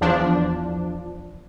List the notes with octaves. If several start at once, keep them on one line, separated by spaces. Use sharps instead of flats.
E2 F3 D4